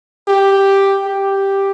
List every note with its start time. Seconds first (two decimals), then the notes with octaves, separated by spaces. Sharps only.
0.28 G4
1.07 G4